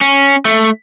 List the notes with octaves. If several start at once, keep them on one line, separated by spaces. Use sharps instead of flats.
C#4
A3